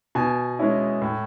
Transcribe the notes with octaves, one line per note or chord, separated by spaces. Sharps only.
B2 G#5
G#3 C#4 E4
A2